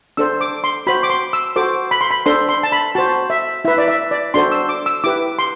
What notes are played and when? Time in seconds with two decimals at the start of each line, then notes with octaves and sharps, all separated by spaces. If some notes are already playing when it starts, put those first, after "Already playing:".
0.17 D4 A4 C5 E6
0.41 D6
0.64 C6
0.87 F#4 C5 B5
1.03 D6
1.10 C6
1.33 E6
1.56 F#4 A4 C5 D6
1.91 B5
2.01 C6
2.11 B5
2.26 D4 A4 C5 C6
2.49 C6
2.63 A5
2.72 B5
2.95 F#4 C5 A5
3.30 E5
3.65 E4 B4 E5
3.78 D5
3.88 E5
4.11 D5
4.34 D4 F#4 A4 C5 C6
4.52 E6
4.69 D6
4.86 E6
5.04 E4 G4 B4 D6
5.39 C6